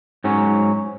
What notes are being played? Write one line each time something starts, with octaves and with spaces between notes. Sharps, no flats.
G#2 F#3 C#4